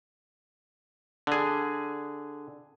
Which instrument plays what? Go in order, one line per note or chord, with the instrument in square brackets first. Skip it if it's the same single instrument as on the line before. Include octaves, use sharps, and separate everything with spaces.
[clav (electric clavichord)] D3 G#4